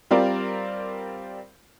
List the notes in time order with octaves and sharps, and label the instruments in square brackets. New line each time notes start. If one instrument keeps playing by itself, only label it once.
[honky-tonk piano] G3 C4 F4 A#4 D5